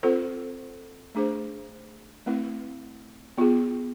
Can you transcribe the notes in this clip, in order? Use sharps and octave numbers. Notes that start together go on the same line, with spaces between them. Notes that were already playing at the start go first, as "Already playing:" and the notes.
C4 F4 A4 C5
A3 D4 G#4 C5
A3 C4 E4 B4
B3 F4 G#4